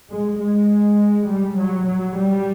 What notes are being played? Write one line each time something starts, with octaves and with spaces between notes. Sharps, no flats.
G#3
G#3
G3
F#3
F#3
G3